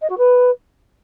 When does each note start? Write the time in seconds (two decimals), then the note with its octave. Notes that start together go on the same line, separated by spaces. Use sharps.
0.01 D#5
0.10 F#4
0.18 B4